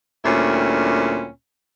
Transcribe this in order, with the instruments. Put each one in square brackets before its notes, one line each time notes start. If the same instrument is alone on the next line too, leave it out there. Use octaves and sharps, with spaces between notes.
[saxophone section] D2 A#2 G3 C4 C#4 E4